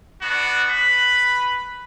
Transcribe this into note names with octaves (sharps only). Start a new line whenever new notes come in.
B3 D4 F#4
B4 B5